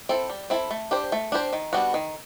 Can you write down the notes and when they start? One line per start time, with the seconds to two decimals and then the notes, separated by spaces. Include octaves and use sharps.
0.09 C4 E4 A4
0.29 G3
0.50 C4 E4 A4
0.71 A3
0.91 D4 G4 C5
1.12 A3
1.32 D4 G4 C5
1.53 D#3
1.73 G3 B3 D4 F#4
1.94 D#3